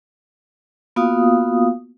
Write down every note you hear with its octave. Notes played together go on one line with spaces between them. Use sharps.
A#3 B3 F4 F#4 F5 D#6